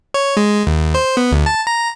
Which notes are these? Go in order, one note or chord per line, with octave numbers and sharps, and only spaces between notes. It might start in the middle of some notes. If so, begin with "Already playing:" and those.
C#5
G#3
D#2
C5
B3
D2
A5
A#5